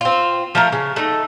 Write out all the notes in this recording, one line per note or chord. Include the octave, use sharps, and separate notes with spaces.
C4 F4
F3 A3 A#4
C#3
A3 D#4